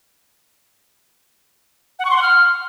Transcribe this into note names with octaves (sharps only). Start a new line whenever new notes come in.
F#5
C#6
C6
F#5
F6